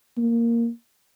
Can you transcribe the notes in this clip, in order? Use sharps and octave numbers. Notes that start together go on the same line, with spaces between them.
A#3